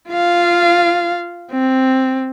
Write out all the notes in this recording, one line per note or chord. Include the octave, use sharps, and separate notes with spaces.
F4 F5
C4